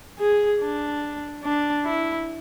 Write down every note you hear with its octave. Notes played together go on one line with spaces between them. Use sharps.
G#4
D4
D4
E4